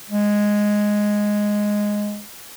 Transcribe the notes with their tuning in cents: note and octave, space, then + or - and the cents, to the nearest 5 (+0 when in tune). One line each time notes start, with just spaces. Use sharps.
G#3 +0